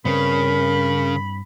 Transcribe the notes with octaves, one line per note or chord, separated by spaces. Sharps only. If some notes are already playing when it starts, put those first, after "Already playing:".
G2 C#3 C4 A#4 B4 B5